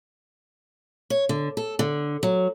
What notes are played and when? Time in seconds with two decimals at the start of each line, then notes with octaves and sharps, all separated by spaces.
1.10 C#5
1.29 D3
1.57 A4
1.79 D3
2.23 F#3